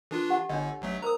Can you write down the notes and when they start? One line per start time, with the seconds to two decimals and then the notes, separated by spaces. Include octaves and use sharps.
0.11 E3 D4 F4 A4
0.29 G4 F#5
0.49 G1 D3 D4 C#5 D#5
0.82 A1 F#3 A3
1.02 A#4 C5 A#5 D#6